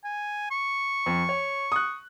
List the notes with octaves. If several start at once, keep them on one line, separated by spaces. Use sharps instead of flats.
G#5
C#6
F2
C#5
D#6 F#6